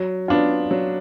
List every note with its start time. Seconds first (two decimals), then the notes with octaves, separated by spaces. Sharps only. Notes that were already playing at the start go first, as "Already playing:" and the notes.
Already playing: F#3
0.28 B3 D4 F4
0.71 F#3